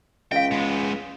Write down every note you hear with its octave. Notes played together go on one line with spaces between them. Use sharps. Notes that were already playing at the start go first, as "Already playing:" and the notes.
C#2 E5 F5 G5
G#3 B3